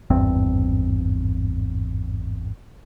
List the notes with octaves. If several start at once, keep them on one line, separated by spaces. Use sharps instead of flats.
G#1 E2 G2 C4